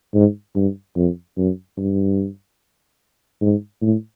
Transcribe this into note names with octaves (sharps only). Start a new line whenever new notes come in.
G#2
G2
F2
F#2
G2
G#2
A2